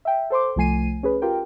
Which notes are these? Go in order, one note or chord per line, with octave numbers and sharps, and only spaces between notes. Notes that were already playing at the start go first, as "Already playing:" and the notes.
E5 G5
A4 C5 C6 D6
C2 F3 A3 G#5 C7 D#7
C#4 G#4 B4
F4 G4 A#4 G5